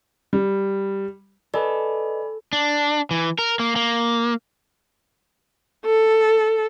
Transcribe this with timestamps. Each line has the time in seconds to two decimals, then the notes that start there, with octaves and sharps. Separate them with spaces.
0.33 G3
1.54 A4 B4 D5 D#5 G#5 B5
2.53 D4
3.11 E3
3.39 A#4
3.59 A#3
3.76 A#3
5.85 A4